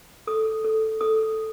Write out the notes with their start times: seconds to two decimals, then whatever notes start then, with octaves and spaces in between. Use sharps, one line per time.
0.27 A4 D#6
0.64 A4
1.01 A4 D#6